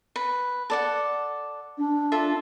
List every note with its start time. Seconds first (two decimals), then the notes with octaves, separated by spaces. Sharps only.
0.16 B4
0.70 A4 D5 F#5
1.78 D4
2.12 F4 A4 E5